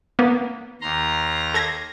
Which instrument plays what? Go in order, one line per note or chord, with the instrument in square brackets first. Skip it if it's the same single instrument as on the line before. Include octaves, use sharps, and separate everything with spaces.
[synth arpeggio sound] A#3 B3
[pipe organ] D#2 A#5 C6
[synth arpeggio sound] A4 G#6 A#6